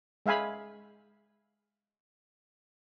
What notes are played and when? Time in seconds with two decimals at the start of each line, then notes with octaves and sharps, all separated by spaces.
0.26 G#3 E5 F5 G#5 B5